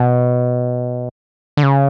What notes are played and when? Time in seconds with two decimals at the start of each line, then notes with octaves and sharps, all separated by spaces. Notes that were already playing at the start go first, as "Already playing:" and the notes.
Already playing: B2
1.57 D3
1.63 C#3